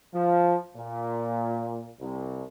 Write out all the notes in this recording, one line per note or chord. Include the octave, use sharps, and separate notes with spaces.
F3
A#2
C2